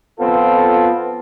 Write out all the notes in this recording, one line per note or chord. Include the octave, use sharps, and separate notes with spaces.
F2 B3 C4 F4 A4